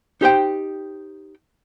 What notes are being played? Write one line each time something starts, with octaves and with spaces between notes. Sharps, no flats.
D#4 G4 C5 G5